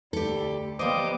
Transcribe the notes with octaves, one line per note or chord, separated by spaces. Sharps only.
D2 G3 G4 A4
F3 G3 A#3 B3 C5 D#5 D6